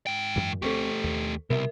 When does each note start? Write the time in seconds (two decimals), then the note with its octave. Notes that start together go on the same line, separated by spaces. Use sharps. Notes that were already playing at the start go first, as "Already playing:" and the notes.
0.07 G#2 G5
0.36 F#2 E3
0.62 D2 A3 C4 G4 A4 C5 C#6
1.04 D#2
1.50 C2 B2 G3 A#4 E5